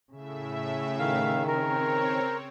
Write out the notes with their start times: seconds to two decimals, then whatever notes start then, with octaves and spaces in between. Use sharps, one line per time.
0.12 A2 C#3 E5
0.99 D#3 F5
1.48 C4 A#4 C#5